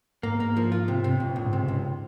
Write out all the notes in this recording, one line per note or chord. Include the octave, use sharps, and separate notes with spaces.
G#2 A#3
A#3
F3
F4
C3
G2 C3
G#2
C#2 A#2
C#2 A#2
G#2
C3
C#2 G#2